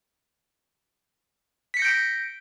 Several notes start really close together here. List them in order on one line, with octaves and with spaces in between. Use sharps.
B6 C#7 A#6 G6 D7